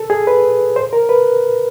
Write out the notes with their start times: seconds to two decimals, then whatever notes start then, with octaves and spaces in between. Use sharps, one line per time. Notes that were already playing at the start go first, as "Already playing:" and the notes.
Already playing: A4
0.10 G#4
0.27 B4
0.76 C5
0.93 A#4
1.09 B4